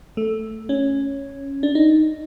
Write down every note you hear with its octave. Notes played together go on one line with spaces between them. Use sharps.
A3
C#4
D4
D#4